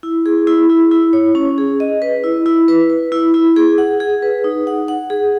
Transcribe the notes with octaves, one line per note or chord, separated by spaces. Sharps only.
E4
G#4
E4
E4
E4
C#5
C#4
G#4
D#5
B4
E4
E4
B4
B4
E4
E4
G#4
F#5
G#4
B4
D#4
F#5
F#5
G#4